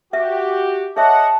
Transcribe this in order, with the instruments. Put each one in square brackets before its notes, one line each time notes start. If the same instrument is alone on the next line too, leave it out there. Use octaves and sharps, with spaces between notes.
[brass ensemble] F#4 G4 [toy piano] E5
[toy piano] G#4 E5 [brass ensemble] C#5 D#5 F#5 [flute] A5